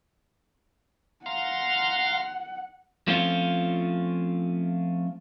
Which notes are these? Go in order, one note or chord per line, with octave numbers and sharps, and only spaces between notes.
F5 F#5 A#5 C6
F3 A3 C4 C#4 F4